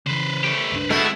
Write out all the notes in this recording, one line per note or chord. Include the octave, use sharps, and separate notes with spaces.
C#3 E3 B4 C5
A3 G4
C#2 G2 D4
B2 G#3 A3 C4 E4